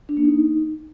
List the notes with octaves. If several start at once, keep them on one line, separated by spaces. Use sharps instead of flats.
D4
A#3
D#4